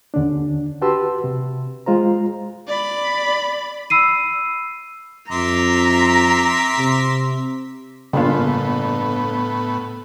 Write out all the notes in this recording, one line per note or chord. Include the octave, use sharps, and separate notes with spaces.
D#2 D3 C#4 D4
F#4 G4 B4 A5 C6 E6
C3
G#3 F4 C5 A#5
D5 B5
B5 E6 C7 D#7
F2 E5 A#5 C6 D6
C3
G1 A2 C#3 A#3 B3 F4